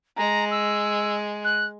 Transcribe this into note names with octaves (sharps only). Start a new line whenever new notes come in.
G#3 A#5
E6
F#6